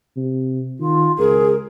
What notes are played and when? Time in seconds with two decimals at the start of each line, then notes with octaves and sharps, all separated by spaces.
0.17 C3
0.80 D#3 F4
1.18 C#2 G#4 A#4